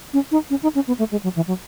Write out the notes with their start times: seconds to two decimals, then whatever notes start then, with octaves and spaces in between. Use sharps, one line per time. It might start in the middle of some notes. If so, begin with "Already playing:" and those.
0.13 C#4
0.31 D#4
0.50 C#4
0.63 D#4
0.75 C#4
0.87 B3
0.99 A3
1.12 G#3
1.23 F#3
1.36 E3
1.47 F#3